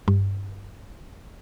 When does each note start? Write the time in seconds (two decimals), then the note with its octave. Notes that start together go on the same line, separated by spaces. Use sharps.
0.08 G2